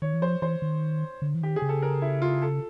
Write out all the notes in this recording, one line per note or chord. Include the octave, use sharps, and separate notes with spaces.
D#3 C#5
E3
F3 C5
E3 C5
D#3
D3
E3
D#3 G4
G#4
C#3
A4
A#4
E4
F4
A4